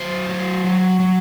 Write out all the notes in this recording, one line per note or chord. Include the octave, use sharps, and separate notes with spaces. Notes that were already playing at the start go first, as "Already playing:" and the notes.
Already playing: F#3 C5
F#3
F#3
F#3